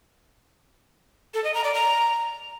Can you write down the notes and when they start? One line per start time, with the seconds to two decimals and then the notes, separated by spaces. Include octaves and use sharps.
1.34 A4
1.44 D#5
1.54 A#5
1.64 D5
1.74 A#5